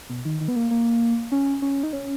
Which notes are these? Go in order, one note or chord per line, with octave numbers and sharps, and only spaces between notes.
B2
D#3
D#3
B3
A#3
A#3
C#4
C#4
D#4
C#4